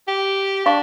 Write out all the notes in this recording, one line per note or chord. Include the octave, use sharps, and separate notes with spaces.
G4
D4 F5 C#6